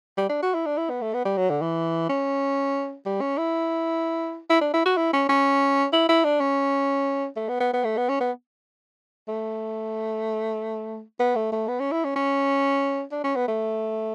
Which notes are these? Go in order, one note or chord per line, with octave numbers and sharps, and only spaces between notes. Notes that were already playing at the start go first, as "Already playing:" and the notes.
G3
D4
F#4
E4
D4
E4
B3
A3
B3
G3
F#3
D3
E3
C#4
G3
C#4
E4
E4
D4
E4
F#4
E4
C#4
C#4
E4
E4
D4
C#4
A3
B3
B3
B3
A3
B3
C#4
B3
A3
B3
A3
A3
B3
C#4
E4
C#4
C#4
D4
C#4
B3
A3